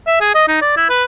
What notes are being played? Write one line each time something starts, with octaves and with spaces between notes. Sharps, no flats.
E5
G#4
D#5
D#4
D5
E4
B4